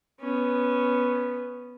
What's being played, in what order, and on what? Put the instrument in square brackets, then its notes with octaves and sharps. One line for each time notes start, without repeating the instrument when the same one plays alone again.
[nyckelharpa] B3 C#4